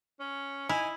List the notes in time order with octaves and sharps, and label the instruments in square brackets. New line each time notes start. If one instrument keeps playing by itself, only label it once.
[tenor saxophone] C#4
[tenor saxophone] D#4 [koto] E4 [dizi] G#5